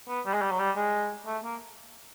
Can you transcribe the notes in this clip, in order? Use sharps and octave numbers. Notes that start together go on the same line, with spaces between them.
B3
G3
G#3
G3
F#3
G3
G#3
A3
A#3